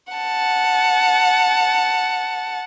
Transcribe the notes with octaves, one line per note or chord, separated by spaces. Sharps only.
F#5 A5